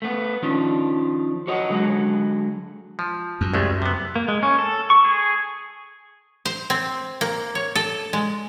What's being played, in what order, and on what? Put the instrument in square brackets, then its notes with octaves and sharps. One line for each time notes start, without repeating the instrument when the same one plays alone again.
[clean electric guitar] A3 B3
D#3 F3 C#4 D4
F#4 C#5 D#5 F5 F#5
D3 F#3 G#3 F#4 G#4
[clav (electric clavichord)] F3
[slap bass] F#2
[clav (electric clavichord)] C2 G#3 A3
C3 B3
[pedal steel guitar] A#3
G#3
C#4
A4
C#6
G#4
[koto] C5
C4
A#3
C#5
A4
G#3